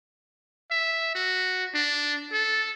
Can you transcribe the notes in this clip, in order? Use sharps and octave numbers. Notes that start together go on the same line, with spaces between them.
E5
F#4
D4
A4